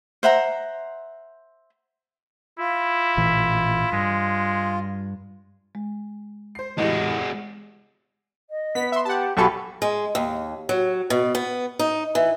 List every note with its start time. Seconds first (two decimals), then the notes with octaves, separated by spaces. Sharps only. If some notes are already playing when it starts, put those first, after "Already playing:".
0.23 C5 E5 F#5 A#5
2.59 E4 F4
3.17 A1 A#2 E3
3.92 G2 G#3
5.75 G#3
6.55 C5 C7
6.78 E2 A2 E3 G#3 F#4 G4 D#5
8.50 D#5
8.75 B3 B6
8.92 E5 C6
9.05 G4 F#5 A5
9.37 B1 F#4 G4 A4 G#5 B5 C#6
9.82 G#3
10.15 D#2
10.69 F#3
11.10 B2
11.35 B3
11.79 D#4
12.15 E3